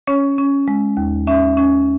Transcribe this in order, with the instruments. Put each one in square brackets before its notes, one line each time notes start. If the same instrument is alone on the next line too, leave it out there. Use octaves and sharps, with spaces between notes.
[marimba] C#4 C#5
C#4
G#3
D#2
C#4 E5
C#4